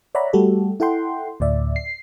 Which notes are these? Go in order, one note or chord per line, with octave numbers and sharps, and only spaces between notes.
C#5 D5 E5 F#5 A#5 B5
G3 A3 F#4 G4 A4
E4 A4 F#5 G5 C6
D2 A2 D5 E5
C7